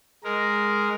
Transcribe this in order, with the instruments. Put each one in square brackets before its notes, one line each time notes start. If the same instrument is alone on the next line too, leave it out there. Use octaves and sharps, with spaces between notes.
[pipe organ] G#3 A#4